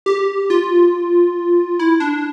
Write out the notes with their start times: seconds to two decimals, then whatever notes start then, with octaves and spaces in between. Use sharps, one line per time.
0.06 G4
0.50 F4
1.79 E4
2.00 D4